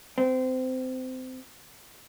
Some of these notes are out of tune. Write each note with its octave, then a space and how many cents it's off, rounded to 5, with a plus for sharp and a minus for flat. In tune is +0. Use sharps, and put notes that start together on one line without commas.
C4 -25